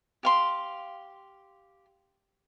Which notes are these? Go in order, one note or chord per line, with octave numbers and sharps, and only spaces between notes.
G4 F5 C6